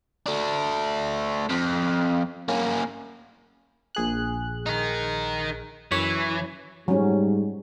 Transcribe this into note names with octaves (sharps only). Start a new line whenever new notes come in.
A3 D4
F2
A#3 C#4
A#1 G#4 F#6
D#4 A#4
F#2 E3 C#5 B5
G#2 F#3 G3 C#4